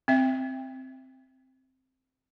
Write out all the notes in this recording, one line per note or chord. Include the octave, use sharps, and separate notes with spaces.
C4 E5